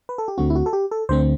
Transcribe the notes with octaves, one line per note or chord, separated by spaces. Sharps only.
B4
A4
G4
D2 D3 A3 C4 F#4
E4
F#4
A4
G4
A4
D2 D3 A3 C4 C5